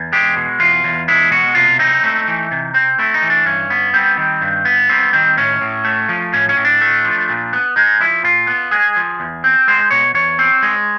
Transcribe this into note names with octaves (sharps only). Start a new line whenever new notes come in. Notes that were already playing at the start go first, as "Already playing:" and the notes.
Already playing: E2
G#3 G4
B2
E2 F4
E2
G#3 E4
B2 F#4
C3 F4
C4 D#4
A3
E3
C3
C4
A3 E4
D#4
E3
D4
G2 C#4
B3
G3 C4
D#3
G2
B3
G3 C4
D#3 C4
A2 C#4
A2
A3
F3
A2 C#4
C#4
A2
D4
A3
F3
A#2
B3
G#3 D#4
F3 E4
A#2 F4
B3
G#3 G#4
F3
E2
C4
G#3 C5
B2 C#5
E2 C#5
C4
G#3